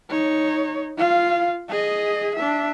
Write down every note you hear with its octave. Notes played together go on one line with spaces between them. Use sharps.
D#4 C#5
F4 F5
G#4 D#5
D4 E5